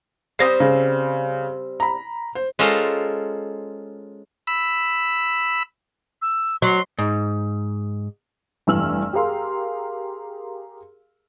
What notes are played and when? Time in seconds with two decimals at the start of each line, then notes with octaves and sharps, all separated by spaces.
0.39 G3 C4 C5 D#6 A#6 C7
0.60 C#3
1.80 A#5 B5
2.35 C5
2.59 G#3 C#4 F4 A4 A#4 C5
4.47 B5 E6
6.22 E6
6.62 F#3 C6
6.99 G#2
8.67 F1 G2 E3 E6 F6 F#7
9.13 G4 G#4 A#4 F5 C6